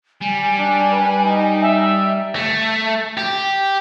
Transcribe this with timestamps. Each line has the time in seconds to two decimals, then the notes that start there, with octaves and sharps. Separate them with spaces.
0.21 G3 G#5
0.59 D4
0.91 B4
1.25 D#4
1.61 E5
2.36 A3
3.17 G4